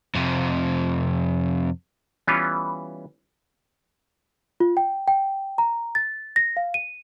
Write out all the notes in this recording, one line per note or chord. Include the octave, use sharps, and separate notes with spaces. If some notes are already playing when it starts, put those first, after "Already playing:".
F2 C3
E3 G3 B3 C#4 F4
F4
G5
G5
A#5
A6
A#6
F5
D#7